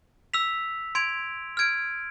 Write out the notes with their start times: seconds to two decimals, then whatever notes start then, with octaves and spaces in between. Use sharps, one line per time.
0.34 E6 B6 F7
0.95 C6 G#6 D7 F7
1.57 F6 G#6 D7